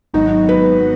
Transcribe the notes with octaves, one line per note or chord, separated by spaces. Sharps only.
G#1 G#2 F#3 B3 D#4 F#4
B4